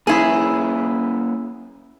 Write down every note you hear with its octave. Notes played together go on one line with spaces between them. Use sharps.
A#3 C#4 E4 G#4 B4